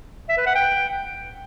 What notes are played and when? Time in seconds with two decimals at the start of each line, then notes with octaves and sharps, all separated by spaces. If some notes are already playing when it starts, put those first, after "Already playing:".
0.29 E5
0.38 B4
0.46 F#5
0.55 G5